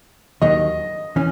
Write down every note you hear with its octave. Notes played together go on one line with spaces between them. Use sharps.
D#2 D#3 F#3 D#5
E3 C#4